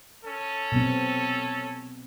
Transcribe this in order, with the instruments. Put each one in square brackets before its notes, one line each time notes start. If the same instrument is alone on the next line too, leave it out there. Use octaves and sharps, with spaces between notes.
[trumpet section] C#4 A4
[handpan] B2 B3 C4